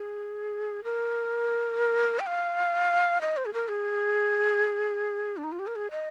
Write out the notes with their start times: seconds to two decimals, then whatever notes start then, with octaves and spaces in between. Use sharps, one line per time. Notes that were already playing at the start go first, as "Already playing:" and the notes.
Already playing: G#4
0.84 A#4
2.19 G5
2.27 F5
3.21 D#5
3.37 C5
3.46 G#4
3.54 A#4
3.68 G#4
5.37 D4
5.44 D#4
5.52 F4
5.59 G4
5.67 A#4
5.76 G#4
5.91 D#5